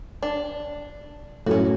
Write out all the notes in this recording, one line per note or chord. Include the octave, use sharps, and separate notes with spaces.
D4
F#2 A2 C#4 F#4